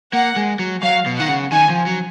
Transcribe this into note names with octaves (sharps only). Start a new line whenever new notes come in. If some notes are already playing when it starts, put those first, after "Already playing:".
A#3 F#5
G#3
F#3
F#3 F5
B2
D#3 F#5
C#3
D#3 G#5
F3
F#3